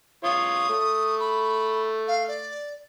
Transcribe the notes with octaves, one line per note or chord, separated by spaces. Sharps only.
F4 C#5 D#6
A3
B5
F5
D5